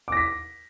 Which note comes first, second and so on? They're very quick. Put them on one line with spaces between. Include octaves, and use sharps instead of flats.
D6 A#6 B6